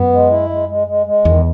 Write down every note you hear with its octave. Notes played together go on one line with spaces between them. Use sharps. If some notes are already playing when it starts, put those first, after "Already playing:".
Already playing: F#2 B3
G#3
E4
G#3
G#3
G#3
G#3
E2 D#3